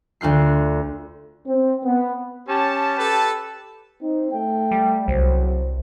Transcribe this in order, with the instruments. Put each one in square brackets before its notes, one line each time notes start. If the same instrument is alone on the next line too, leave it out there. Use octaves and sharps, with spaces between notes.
[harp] D2 F4 F#6 C7
[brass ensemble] C4
B3
[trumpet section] C#4 A5 [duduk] G4
[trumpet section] A4 B4 A5
[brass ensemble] C4 D#4
A3 G5
[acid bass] G3
[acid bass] C2 [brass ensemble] C#3 F#3 C5